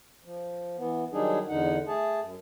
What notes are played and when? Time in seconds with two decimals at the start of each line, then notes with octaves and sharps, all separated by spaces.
0.25 F3
0.78 E3 B3
1.13 D#3 F#3 G3 D4 D#4 G#4
1.49 E2 D3 D#4 F#5
1.87 A3 G#4 A5
2.20 F#2